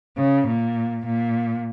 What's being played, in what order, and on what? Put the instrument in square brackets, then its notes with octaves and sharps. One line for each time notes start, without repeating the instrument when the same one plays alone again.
[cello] C#3
A#2
A#2